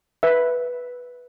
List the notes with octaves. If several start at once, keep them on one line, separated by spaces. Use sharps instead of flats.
B4 E5